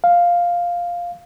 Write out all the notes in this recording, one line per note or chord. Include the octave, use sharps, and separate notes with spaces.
F5